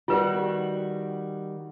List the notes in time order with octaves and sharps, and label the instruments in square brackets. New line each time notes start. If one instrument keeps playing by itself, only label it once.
[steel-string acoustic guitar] D#3 G3 F#4 [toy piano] F4 B4